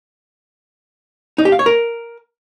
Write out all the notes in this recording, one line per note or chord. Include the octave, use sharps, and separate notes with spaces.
D#4
G4
F5
C#5
A#4